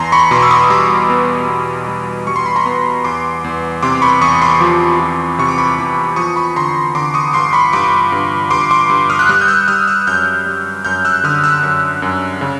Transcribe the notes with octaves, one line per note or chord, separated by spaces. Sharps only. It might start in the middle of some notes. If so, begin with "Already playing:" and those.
Already playing: E2 A#5 C6
B5 C#6
B2 C6 D6
E6
C#6 D#6
G3 C6 D6
B3
B3
G3
G3 C#6
C6
B5
A#5 C6
B3
E2 C6 D6
E2
C3 C6 D6
B5 C#6
E2 C#6 D#6
C6 D6
F3
F3
C3 C#6
D6
B5 C#6
E2
F3 C#6 D#6
B5 C#6
D3 A#5 C6
D3 C6 D6
C#6 D#6
G2 C6 D6
B5 C#6
G2 C6 D6
G2
G2 C6 D6
C6 D6
G2
D#6 F6
F#6
G3 D#6 F6
G6
E6 F#6
G3 D#6 F6
E6 F#6
F#2 F6 G6
G3
F#2 F6 G6
E6 F#6
D3 D#6 F6
E6 F#6
F#2
F#2
C#3